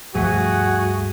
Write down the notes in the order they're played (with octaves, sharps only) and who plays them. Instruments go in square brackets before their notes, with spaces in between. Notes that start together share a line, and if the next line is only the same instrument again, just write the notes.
[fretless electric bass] D2 B2 F3 [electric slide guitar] G2 A3 [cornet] F#4 [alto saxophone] G#4